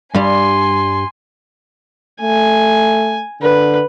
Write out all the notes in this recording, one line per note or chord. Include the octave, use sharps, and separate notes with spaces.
G2 G3 G#5 C6
A3 G#5
D3 B4